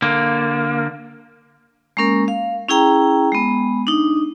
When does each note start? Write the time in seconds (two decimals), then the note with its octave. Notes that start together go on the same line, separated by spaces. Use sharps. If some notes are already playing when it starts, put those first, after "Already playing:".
0.02 D3 A#3
1.97 G#3 A#3 C#4 A#4
2.28 F5
2.69 C#4 E4 G#4 G5 A#5
3.32 G#3 B3
3.87 D4 D#4